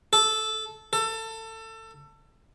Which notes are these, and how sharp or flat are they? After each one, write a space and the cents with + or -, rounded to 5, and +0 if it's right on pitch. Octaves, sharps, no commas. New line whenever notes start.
A4 -10
A4 +25